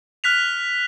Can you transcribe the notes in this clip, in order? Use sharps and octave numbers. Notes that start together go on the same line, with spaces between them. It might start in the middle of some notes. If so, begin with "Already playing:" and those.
F6 F#6 B6 F7